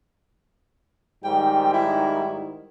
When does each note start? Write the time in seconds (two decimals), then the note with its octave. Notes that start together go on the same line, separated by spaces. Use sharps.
1.24 G#2 D#3 G3 G5
1.73 E4